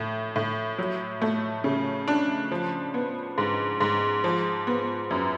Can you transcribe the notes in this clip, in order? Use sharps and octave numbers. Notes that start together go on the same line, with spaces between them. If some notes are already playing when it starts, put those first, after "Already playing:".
Already playing: A2
A2
F#3
A3
C#3
D4
F3
B3
G#2
G#2
F3
B3
F#2